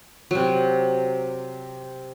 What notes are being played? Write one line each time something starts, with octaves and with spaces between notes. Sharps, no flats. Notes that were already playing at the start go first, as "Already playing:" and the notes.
C3 F#3